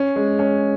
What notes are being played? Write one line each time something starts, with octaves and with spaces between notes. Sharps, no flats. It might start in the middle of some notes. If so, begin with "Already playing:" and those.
Already playing: C#4
G#3
C#4